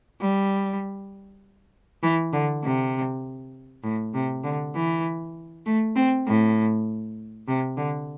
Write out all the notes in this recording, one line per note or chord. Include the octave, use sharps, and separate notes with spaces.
G3
E3
D3
C3
A2
C3
D3
E3
A3
C4
A2
C3
D3